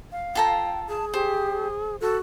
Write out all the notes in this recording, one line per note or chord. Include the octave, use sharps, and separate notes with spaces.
F5
F4 A4 G5 A#5
G#4 A5
G4 C5
F#4 A4